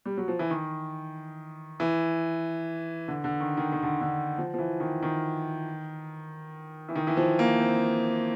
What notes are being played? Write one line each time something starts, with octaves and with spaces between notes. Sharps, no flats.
G3
F#3
F3
E3
D#3
E3
D3
D3
D#3
D#3
D#3
D3
D3
F3
F3
E3
D#3
D#3
E3
D#3
E3
F3
A#3
C4